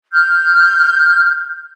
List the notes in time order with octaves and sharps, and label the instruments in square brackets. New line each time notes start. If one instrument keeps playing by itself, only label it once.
[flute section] F6 G6